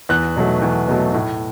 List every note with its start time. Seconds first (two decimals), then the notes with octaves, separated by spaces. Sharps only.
0.09 E2 F#6
0.36 B2 F#3 A3
0.62 E2
0.88 B2 F#3 A3
1.14 A2